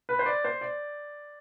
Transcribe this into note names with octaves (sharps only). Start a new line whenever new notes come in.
B4
C5
D5
C5
D5